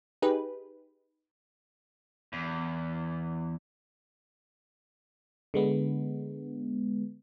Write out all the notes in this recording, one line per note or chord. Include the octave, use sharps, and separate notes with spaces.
D#4 G4 G#4 B4
E2
D3 G#3 B3